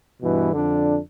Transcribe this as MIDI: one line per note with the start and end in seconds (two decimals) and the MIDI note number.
0.22 0.53 43
0.22 0.53 47
0.22 0.53 52
0.53 0.98 41
0.53 0.98 50
0.53 0.98 62